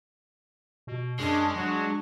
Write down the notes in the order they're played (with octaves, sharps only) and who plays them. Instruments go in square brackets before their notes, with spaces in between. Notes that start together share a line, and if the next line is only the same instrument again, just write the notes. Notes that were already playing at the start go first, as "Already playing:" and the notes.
[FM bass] B2
[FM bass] F#2 [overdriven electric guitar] G#3 [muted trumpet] C#4 [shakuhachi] D4
[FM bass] F#3 [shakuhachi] D4 [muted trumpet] F#4